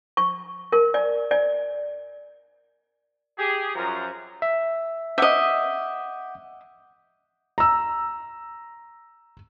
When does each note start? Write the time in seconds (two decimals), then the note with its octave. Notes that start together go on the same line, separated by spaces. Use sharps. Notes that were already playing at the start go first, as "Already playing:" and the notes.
0.17 C#6
0.72 A#4
0.94 D5
1.31 D5
3.38 G4 G#4
3.75 F#2 F3 A#5
4.42 E5
5.18 D#5 E5 F#5 D6 G6
7.58 A#5 E6